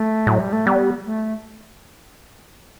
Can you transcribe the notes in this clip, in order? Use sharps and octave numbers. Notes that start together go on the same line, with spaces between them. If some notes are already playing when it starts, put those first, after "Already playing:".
Already playing: A3
A2 F#3
G3
A3
G3 B3
A3